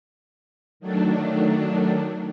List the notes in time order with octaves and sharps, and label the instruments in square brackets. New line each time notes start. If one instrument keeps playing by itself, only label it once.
[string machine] D#3 F#3 A3 D4